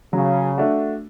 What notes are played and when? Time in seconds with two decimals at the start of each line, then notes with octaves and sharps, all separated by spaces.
0.13 C#3 F#3
0.58 A3 D4 F#4